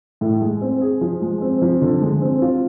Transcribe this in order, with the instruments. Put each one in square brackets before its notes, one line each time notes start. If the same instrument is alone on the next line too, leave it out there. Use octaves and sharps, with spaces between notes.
[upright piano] A2
G#3
C4
G#4
F3
G#3
C4
F3
D3
G#3
C4
F4